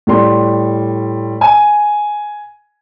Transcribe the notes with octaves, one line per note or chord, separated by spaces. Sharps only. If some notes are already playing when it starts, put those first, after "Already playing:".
A2 G3 C6
G#5